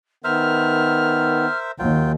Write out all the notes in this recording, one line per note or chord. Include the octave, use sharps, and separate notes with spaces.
D#3 B3 A#4 C5 E5 F6
D#2 F#3 F4 G5